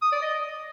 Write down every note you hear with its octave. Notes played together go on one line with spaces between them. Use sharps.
D#6
D5
D#5